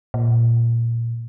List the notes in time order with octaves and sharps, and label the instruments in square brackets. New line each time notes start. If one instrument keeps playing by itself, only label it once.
[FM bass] A#2